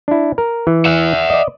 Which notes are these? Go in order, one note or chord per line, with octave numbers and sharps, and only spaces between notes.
D4 E4
A#4
E3
E5 F#5
D5 D#5